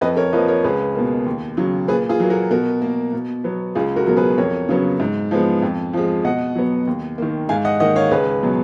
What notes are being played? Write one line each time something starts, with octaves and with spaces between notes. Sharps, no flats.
F2 B4 D#5
A#4 C#5
F3 A#3 B4 D#5
A#4 C#5
C#2 G#4 B4
B2 A#3
D#2
C#3 F#3
A#2 G#4 B4
F4 G#4
F#3 A#3
F#4 A#4
B2 F#4 A#4
A#3
B2
F#3 B3
C#2 F4 G#4
F#4 A#4
B2 F#3 A#4
G#4 B4
F2 A#4 C#5
C#3 F#3 B3
G#2
F3 G#3 B3
F2
F3 G#3
B2 D#5 F#5
F#3 B3
D#2
D#3 A#3
G#2 F5 G#5
D#5 F#5
D#3 A#3 D#5 F#5
C#5 F5
C#2 G#4 B4
B2 F#3